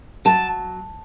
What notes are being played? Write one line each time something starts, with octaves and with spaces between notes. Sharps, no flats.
F#3 A5